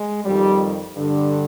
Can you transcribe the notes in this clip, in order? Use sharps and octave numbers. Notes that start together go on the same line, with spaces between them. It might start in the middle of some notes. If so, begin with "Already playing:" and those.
Already playing: G#3
F2 D#3 G3
G2 D3